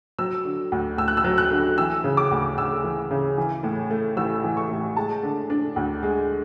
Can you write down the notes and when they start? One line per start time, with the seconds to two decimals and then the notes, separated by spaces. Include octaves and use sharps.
0.19 F#3 E6
0.45 D3
0.72 D2
0.98 D2 E6
1.08 F#6
1.17 E6
1.24 F#3
1.38 F#6
1.51 D3
1.78 E3 E6
2.04 C#3
2.17 D6
2.31 D2
2.58 D2 E6
2.84 E3
3.11 C#3
3.37 E3
3.63 A2
3.91 A3
4.17 A1 E6
4.44 E3
4.57 C#6
4.70 A2
4.97 G#3 A5
5.23 D3
5.50 D4
5.76 D2
6.03 G#3